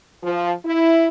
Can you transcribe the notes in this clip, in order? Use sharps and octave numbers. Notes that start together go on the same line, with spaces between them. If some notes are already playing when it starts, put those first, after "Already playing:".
F3
E4